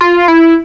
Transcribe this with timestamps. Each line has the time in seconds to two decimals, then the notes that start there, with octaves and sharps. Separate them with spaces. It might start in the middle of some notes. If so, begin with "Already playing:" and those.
0.01 F4
0.28 E4